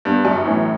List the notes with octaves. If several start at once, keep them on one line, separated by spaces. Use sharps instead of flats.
G2 B3
F#2
A2 E3